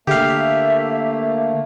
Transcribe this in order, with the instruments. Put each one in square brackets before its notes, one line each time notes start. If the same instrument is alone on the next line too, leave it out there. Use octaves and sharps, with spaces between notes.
[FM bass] D3 [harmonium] A3 A#3 [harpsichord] G4 F5 [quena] E5